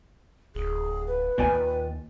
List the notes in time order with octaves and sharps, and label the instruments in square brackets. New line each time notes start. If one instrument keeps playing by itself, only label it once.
[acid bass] D1 [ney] G#4
[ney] B4
[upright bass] D#2 [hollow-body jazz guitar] A#2 D5 G#5 [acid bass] D#3